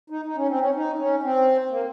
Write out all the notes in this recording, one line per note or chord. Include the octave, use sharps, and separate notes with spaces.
D#4
D#4
C#4
C4
C#4
D#4
C#4
C4
A#3